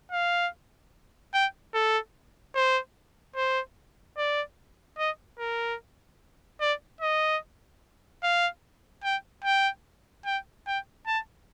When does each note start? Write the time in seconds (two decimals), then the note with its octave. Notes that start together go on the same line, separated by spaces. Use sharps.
0.12 F5
1.34 G5
1.74 A4
2.55 C5
3.36 C5
4.17 D5
4.98 D#5
5.39 A#4
6.61 D5
7.01 D#5
8.23 F5
9.04 G5
9.45 G5
10.25 G5
10.67 G5
11.07 A5